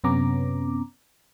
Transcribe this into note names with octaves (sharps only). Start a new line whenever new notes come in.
F#2 C3 B3 C#4 A#5 D6